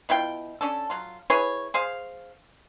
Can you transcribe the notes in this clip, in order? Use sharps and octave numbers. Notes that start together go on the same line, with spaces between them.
B2 E4 F4 G5
C#4 D4 A4
F#3 F4
E4 G#4 B4 C#5
G#4 C5 F5